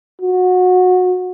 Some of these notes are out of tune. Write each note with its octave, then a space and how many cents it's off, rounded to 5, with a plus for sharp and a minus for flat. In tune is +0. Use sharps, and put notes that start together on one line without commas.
F#4 -20